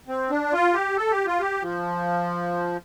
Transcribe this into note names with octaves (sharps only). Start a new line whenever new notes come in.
C4
D4
F4
G4
A4
G4
F4
G4
F3